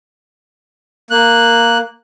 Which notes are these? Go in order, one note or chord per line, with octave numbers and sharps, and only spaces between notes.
A#3 F#6